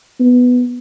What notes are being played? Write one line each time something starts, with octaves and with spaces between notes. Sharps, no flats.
B3